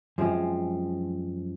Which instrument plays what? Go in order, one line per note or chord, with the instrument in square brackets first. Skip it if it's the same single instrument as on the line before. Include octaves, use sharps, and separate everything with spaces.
[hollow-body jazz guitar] F#2 F3 G#3 C4